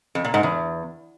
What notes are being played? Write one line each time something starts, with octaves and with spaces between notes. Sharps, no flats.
F2
A#2
G#2
E2